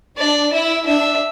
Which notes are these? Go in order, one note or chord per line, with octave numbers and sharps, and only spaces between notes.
D4 D5
E4 E5
D4 E5